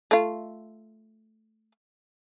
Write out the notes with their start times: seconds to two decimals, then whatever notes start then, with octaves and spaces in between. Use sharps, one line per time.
0.11 A3 F4